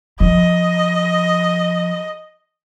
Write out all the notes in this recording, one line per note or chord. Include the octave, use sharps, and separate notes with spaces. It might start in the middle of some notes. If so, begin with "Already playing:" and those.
F3 D#5